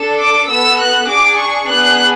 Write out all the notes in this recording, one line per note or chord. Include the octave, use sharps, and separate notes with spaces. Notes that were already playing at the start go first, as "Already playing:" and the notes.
Already playing: D4 A4
D6
B3 F#4 A4 E6
F#6
D4 G#4 D6
C#6
B3 D4 G#4 F#6